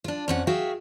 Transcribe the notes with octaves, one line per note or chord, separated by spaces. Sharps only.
D4 F4
F2 C#4 F#5
F#4 G#4 E5 F5 G5